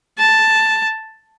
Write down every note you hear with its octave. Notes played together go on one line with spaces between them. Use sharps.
A5